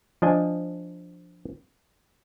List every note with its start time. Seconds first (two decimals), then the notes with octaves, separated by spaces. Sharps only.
0.22 F3 D4 D#5 G#5